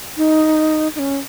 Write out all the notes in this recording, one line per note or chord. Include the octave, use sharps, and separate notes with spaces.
D#4
D#4
C#4